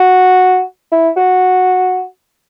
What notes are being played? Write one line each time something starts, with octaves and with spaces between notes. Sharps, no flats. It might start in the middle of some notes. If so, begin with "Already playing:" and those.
Already playing: F#4
E4
F#4